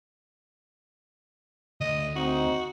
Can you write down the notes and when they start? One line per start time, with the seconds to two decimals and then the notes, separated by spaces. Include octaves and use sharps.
1.81 D2 D#5
2.16 C4 D#4 F#4